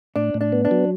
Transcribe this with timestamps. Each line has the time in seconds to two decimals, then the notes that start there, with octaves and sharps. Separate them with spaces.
0.16 A2 D4
0.34 A2
0.41 D4
0.52 B3
0.65 D4
0.71 F#3